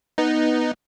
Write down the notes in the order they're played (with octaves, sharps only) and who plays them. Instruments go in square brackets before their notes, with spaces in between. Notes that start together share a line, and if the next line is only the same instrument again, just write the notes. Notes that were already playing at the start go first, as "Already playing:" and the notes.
[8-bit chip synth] B3 D#4